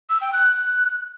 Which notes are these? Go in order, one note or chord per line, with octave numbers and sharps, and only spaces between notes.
E6
G5
F#6